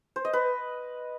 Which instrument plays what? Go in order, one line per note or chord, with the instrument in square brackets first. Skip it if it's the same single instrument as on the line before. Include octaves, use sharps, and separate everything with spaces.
[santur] C5
D#5
B4